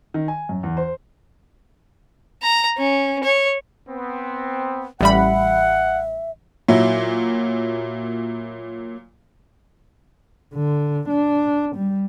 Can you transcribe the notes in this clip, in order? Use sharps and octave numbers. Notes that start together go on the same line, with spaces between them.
D#3
G#5
F#2
E2
C5
A#5
C#4
C#5
B3 C4
A1 G3 E5 F#5 B5
A#2 F#3 E4
D3
D4
G3